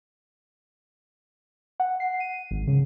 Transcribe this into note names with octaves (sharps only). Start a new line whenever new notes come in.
F#5
C7
D#7
G#1
C#3